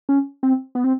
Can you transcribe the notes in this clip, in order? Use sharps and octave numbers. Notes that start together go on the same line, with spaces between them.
C#4
C4
B3
C4